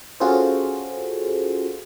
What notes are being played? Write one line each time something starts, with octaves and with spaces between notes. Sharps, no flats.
C#4 F4 F#4 G#4 A4 C5